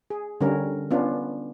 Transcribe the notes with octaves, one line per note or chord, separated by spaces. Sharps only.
G#4
D3 G3 C#4 A#4
B3 C#4 D4 F4